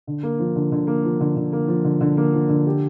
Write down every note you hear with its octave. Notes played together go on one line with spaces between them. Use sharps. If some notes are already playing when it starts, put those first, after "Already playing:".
D3
A#3
F3
D3
D3
A#3
F3
D3
D3
A#3
F3
D3
D3
A#3
F3
D3
G4